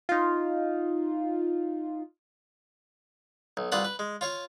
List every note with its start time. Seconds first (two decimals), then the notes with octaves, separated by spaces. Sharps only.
0.09 D#4 F4
3.57 B1
3.72 C2 F4 B4 D5 F#5 D#6
3.85 B4
3.99 G#3
4.21 F4 C#5 F5